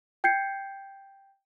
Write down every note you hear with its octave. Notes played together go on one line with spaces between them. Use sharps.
G5 G6 G#6 C7 C#7